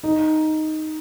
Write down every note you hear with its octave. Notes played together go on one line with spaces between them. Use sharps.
D#4